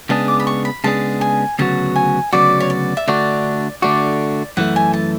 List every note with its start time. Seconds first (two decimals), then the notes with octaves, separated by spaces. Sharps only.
0.09 C#3 G#3 B3 D4 G#4 A5
0.28 D6
0.40 B5
0.47 C#6
0.65 B5
0.84 C#3 G#3 B3 D4 G#4 A5
1.21 G#5
1.59 D2 C#3 F#3 B3 F#4 A5
1.96 G#5
2.33 D2 C#3 F#3 B3 F#4 D5
2.60 C#5
2.70 D5
2.97 E5
3.08 D3 A3 D4 F#4 D5
3.82 D3 A3 D4 F#4 D5
4.57 F#2 E3 A3 F#5
4.76 G#5
4.93 A5